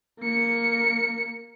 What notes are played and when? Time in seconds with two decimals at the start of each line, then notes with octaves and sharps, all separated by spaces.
0.20 A#3 C#7